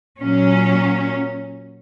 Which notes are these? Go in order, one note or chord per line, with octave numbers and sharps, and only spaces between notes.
A#2 F#3 C#4